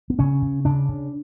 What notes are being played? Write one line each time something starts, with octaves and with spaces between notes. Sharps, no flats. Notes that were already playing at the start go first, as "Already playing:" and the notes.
B3
C#3 C#4
C#3
C#3 D4
C#3